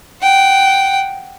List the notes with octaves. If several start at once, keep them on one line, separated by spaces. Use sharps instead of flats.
F#5 G5